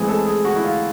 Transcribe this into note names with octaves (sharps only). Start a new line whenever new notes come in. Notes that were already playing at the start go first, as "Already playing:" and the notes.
Already playing: A2 E3 G#3 C4 G#4
A4
G#4
F#4
E4
F4